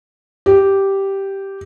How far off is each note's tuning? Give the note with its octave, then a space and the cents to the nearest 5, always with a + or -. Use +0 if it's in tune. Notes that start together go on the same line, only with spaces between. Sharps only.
G4 -5